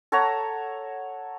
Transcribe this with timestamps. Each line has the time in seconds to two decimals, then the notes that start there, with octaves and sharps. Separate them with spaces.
0.12 A4 C#5 F#5 A#5